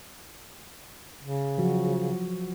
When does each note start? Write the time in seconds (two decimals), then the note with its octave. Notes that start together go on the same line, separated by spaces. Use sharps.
1.21 C#3
1.58 F3 F#3 F#4